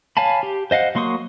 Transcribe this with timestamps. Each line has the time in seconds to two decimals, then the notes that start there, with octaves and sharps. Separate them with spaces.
0.17 C#5 F5 G#5 A5 B5
0.43 G4
0.71 C5 D#5 F5 F#5
0.95 F#3 A#3 C6 C#6 D#6